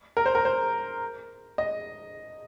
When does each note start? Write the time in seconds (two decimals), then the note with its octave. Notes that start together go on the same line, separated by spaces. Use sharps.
0.17 A#4
0.26 C5
0.35 A#4
0.45 C5
1.58 D#5